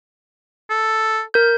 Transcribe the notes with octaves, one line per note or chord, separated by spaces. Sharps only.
A4
A#4 G6